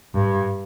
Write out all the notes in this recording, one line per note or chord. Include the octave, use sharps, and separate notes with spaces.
G2